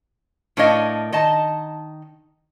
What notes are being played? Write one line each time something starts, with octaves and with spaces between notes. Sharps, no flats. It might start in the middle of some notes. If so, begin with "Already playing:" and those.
A2 D4 A#4 C#5 D#5 F5
D#3 D#5 A5 A#5